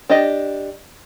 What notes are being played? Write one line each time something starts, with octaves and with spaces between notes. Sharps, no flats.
D4 G4 D#5